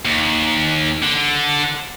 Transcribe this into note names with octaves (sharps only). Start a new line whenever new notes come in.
D#2
D3